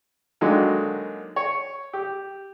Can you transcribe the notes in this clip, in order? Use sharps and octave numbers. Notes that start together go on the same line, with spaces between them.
D3 D#3 F#3 G#3 A#3
C#5
G4